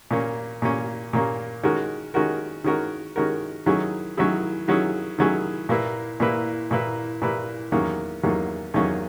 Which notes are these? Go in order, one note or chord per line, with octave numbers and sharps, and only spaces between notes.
A#2 A#3 C#4
A#2 A#3 C#4
A#2 A#3 C#4
D#3 G#3 C#4 F#4 A#4
D#3 G#3 C#4 F#4 A#4
D#3 G#3 C#4 F#4 A#4
D#3 G#3 C#4 F#4 A#4
D#3 F#3 C#4 E4 G#4
D#3 F#3 C#4 E4 G#4
D#3 F#3 C#4 E4 G#4
D#3 F#3 C#4 E4 G#4
A#2 A#3 E4 B4
A#2 A#3 E4 B4
A#2 A#3 E4 B4
A#2 A#3 E4 B4
E2 D#3 F#3 A#3 C#4
E2 D#3 F#3 A#3 C#4
E2 D#3 F#3 A#3 C#4